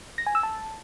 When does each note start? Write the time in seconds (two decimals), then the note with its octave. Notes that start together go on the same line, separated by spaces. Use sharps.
0.18 A#6
0.27 G#5
0.35 E6
0.43 A5